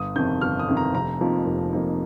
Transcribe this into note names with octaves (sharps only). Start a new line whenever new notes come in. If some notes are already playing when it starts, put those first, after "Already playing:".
Already playing: G1 D#6
F2 C3 D#3 G6
G1 F6
D#6
F2 C3 D#3
A#5
F1 A#5
F2 F3 A#3 D#4
F1
F2 F3 A#3 D#4